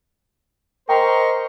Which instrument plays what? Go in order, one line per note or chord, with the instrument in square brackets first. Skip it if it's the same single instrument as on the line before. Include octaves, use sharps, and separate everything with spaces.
[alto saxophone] A#4 [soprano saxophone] C5 [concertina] D#5 C#6 [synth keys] G5 A#5